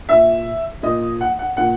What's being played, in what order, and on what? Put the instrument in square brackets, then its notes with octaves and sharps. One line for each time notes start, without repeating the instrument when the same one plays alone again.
[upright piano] A#2 E5
A#2 D#5
F#5
F#5
A#2 F#5